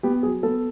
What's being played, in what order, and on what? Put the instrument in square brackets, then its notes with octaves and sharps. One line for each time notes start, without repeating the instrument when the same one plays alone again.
[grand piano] B3 G4
F#3 G#4
B3 A4